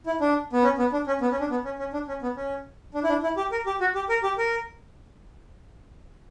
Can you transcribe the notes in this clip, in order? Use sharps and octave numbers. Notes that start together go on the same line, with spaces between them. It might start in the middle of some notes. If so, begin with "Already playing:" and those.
E4
D4
B3
C#4
B3
D4
C#4
B3
C#4
D4
B3
C#4
C#4
D4
C#4
B3
C#4
D4
E4
D4
E4
G4
A#4
G4
F#4
G4
A#4
G4
A#4